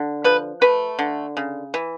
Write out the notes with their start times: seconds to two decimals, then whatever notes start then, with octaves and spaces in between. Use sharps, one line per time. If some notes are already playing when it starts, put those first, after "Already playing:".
Already playing: D3
0.24 F3 B4
0.61 A3 B4
0.99 D3
1.37 C#3
1.74 E3